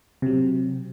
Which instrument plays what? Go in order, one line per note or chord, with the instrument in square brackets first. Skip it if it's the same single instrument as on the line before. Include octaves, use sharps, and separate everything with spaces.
[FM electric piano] C3 F#3